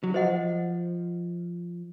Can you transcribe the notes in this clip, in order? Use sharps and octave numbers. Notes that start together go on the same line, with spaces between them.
F#3
F3 C5 D#5 F#5